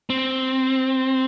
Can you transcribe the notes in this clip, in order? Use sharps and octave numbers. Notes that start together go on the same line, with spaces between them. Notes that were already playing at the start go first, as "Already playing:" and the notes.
C4